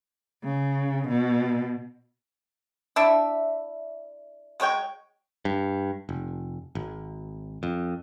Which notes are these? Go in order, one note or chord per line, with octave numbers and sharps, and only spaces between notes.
C#3
B2
D4 E4 E5
F#3 G#3 C#5 G5
G2
F1
G#1
F2